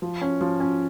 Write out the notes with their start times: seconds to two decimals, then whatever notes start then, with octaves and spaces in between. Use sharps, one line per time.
0.02 F3
0.21 C#4
0.41 F3
0.60 C#4